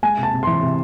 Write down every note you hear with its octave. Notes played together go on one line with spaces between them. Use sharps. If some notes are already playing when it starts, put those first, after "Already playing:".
G#3 G#5
C3
A5
C3
E3 C6
C3